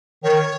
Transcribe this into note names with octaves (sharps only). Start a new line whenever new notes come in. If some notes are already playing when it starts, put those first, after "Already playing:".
D#3 C#5